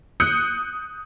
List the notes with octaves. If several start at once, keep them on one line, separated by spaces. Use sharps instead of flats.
D#6 F#6 G6 C#7